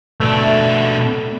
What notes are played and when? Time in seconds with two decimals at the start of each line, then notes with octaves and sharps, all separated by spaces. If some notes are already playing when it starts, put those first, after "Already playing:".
0.20 B2 A3 D4